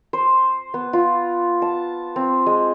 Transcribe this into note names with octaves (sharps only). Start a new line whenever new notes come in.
C5
B3
F4
A5
C4
G#3